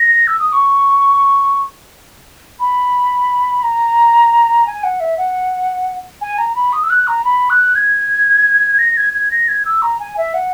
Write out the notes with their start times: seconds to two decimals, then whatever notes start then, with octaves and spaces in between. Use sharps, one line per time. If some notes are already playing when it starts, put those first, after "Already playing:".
Already playing: A#6
0.27 E6
0.39 D#6
0.53 C#6
2.59 B5
3.63 A#5
4.67 G#5
4.83 F#5
5.00 E5
5.17 F#5
6.21 G#5
6.38 A#5
6.55 B5
6.73 D#6
6.83 E6
6.90 F#6
7.07 A#5
7.24 B5
7.50 F#6
7.75 G#6
8.79 A#6
8.97 G#6
9.13 G#6
9.31 A#6
9.48 G#6
9.65 E6
9.82 A#5
10.00 G#5
10.17 E5
10.34 F#5